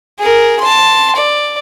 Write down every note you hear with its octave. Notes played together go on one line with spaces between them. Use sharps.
G#4 A#4
A5 C6
D5